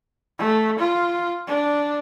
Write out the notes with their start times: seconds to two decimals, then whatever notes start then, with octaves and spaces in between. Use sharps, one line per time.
0.39 A3
0.79 F4
1.47 D4